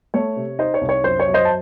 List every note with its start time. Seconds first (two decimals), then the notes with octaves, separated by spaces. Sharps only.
0.14 A3 C#5
0.36 C3
0.59 D#4 C5 D#5
0.74 C#5
0.81 C2
0.89 C#5
1.04 F#2 C5
1.20 C#5
1.28 F#2
1.34 C5 D#5
1.45 A5